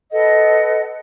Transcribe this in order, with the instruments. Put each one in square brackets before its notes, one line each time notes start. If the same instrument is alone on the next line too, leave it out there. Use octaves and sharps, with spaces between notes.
[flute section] A4 B4 D#5 F#5